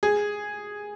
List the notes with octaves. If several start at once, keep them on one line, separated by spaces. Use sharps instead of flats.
G#4